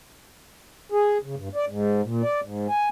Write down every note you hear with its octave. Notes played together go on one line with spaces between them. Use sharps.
G#4
C#3
G2
D5
G#2
A#2
D5
G#2
G#5